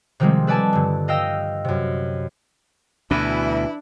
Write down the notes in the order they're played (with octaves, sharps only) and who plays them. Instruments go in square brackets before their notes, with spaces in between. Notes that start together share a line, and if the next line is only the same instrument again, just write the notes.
[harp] C3 D#3 F3 G3 G#3 C4
A4 B4 D5 G#5 A5
G2 D3
D#5 F5 G5 E6 A#6
F#2 C3
[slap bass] D2 B2 [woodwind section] E3 [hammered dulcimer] D4 [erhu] E4